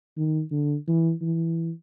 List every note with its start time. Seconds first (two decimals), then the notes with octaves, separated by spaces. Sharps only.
0.17 D#3
0.52 D3
0.88 E3
1.22 E3